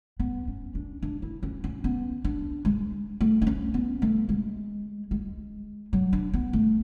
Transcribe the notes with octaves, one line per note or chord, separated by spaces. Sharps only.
B3
C#4
D4
D4
E4
C#4
C#4
B3
D4
G#3
A3
D4
C#4
B3
A3
G#3
G#3
F#3
D4
B3
A3